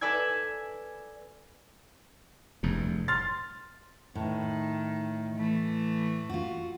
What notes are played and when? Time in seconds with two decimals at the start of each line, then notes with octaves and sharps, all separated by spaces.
0.01 A4 B4 D5 G#5 E6 G#6
2.63 F1 E2 G2
3.08 C6 F6 A6
4.15 A2 D#3
5.35 E3 A3
6.30 F4 F#4